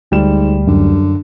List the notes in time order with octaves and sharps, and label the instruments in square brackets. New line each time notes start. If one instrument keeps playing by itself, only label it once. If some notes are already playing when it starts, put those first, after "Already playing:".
[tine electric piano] D2 [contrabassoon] G#2 [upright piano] G3 E7
[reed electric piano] F#2 [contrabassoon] D3